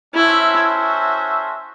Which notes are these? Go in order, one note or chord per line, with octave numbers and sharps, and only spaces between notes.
C#4 E4 F#4 A4 C5 E5